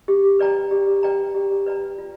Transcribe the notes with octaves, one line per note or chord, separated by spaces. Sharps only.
G4
B4 D5 G5 A#5
G4
B4 D5 G5 A#5
G4
B4 D5 G5 A#5
F4